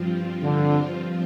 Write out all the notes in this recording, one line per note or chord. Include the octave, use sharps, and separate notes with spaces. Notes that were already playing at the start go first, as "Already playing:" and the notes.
Already playing: G2 F3 C4 F4
D3